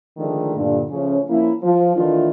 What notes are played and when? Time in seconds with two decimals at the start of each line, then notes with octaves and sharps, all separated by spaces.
0.17 D3 D#3 F3 G#3 A3
0.56 G2 A#2 D3
0.90 C#3 F3 A3 C#4
1.29 F3 A#3 C#4 E4
1.63 F3
1.96 D#3 E3 A3 D4 D#4 F4